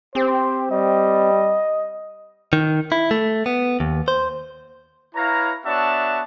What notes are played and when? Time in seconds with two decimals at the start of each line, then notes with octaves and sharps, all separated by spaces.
0.15 C4 G4 C5
0.71 G3 D#5
2.53 D#3
2.92 E4
3.11 A3
3.46 B3
3.80 D#2
4.08 C5
5.15 E4 B4 C#5 F5 A#5
5.65 B3 D4 F#4 C#5 E5 A5